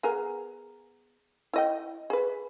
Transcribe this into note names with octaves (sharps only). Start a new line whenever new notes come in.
B3 G#4 A#4
E4 D#5 G5
G#4 B4